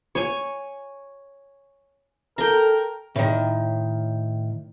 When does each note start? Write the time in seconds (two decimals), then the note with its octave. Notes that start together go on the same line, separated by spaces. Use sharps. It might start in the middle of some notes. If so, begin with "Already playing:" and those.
0.15 C#5 G#5
2.38 A4 A#4 G5 A#5
3.16 A2 D#3